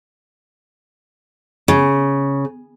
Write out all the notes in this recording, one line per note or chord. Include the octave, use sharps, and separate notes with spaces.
C#3